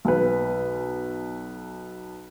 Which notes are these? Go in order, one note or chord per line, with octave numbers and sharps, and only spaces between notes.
B1 B4